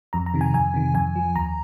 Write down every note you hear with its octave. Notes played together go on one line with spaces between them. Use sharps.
F2 A#5
A#5
C3 D#3
G#5
F2 G#5
C3 D#3
F2 G#5
F3
D#2 A#5